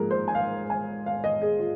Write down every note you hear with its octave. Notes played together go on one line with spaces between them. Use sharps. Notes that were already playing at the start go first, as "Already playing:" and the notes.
Already playing: G#2 F3 A#3 G#4 A#4
C5
G#5
F5
G#5
F5
D#5
G#4
F4